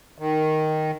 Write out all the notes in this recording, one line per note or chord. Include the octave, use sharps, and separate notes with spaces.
D#3